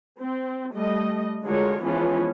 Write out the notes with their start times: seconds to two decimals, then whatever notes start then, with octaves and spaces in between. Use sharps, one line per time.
0.20 C4
0.74 G3 A3 D#5
1.44 D3 G#3 F4 F#4 A#4 C#5
1.83 E3 F3 G#3 B3 C#4 F4